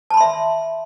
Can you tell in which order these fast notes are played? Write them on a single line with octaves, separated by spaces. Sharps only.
A5 B5 C6 E5